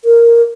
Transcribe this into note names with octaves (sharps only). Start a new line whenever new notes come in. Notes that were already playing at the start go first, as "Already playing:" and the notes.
A#4